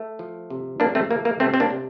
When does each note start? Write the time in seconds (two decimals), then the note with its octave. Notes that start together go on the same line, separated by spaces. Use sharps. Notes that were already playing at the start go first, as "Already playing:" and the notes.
Already playing: A3
0.19 F3
0.50 C3
0.80 F3 A#3 D4
0.95 A3 C4
1.10 A3 A#3
1.25 A#3
1.40 C3 A3 C4
1.54 C4
1.60 A#3 D4
1.70 C3